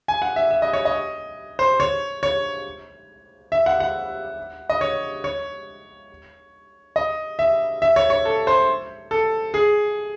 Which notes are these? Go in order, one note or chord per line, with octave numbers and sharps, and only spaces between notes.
G#5
F#5
E5
E5
D#5
C#5
D#5
C5
C#5
C#5
E5
F#5
F#5
D#5
C#5
C#5
D#5
E5
E5
C#5
C#5
A4
C5
A4
G#4